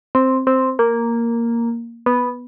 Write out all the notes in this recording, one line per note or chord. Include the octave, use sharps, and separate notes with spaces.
C4
C4
A#3
B3